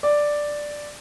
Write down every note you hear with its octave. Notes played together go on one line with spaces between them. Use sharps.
D5